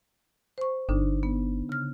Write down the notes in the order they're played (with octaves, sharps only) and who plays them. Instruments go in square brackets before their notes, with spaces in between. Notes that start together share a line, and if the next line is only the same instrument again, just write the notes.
[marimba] C5 C#6
[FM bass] G1 [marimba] D3 D4 D#4
[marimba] B3
C#3 F6